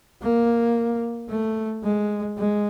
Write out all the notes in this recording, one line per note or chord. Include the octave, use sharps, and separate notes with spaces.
A#3
A3
G#3
G#3